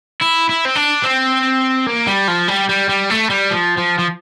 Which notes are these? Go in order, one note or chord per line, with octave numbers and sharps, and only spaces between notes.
E4
E4
C4
D4
C4
A#3
G3
F3
G3
G3
G3
A3
G3
F3
F3
F3